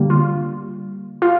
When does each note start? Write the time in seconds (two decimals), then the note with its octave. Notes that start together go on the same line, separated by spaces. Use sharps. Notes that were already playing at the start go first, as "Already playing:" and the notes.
Already playing: D3 G3 A#3
0.10 F4
1.22 F4